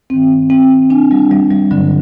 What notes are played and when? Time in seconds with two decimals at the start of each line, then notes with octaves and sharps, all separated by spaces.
0.10 G2 D#3 C4
0.50 C4
0.90 D4
1.11 G3
1.31 G3
1.51 G3
1.71 G2 D3 F#3